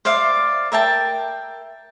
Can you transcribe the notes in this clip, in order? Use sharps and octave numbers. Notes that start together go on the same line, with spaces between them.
C5 D5 E5 F5
A#4 E5 G5 A5